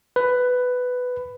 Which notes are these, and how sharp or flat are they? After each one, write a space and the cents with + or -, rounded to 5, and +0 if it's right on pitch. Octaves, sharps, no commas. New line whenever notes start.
B4 +10